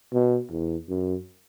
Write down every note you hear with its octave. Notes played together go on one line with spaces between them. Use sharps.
B2
E2
F#2